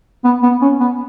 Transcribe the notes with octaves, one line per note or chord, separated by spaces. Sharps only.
B3
B3
C#4
B3